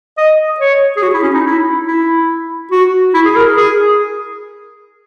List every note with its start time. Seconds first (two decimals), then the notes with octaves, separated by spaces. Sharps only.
0.18 D#5
0.60 C#5
0.97 G#4
1.03 F#4
1.14 E4
1.24 C#4
1.35 D#4
1.45 E4
1.87 E4
2.72 F#4
3.14 E4
3.26 G#4
3.36 A#4
3.58 G#4